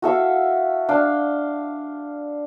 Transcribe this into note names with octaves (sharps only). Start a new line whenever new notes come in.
F#4 A4 E5 F5
D4 F5 G5